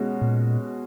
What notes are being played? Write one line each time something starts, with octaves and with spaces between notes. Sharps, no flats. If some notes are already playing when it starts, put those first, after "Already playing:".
Already playing: B2 G#3 C#4 F#4
A#2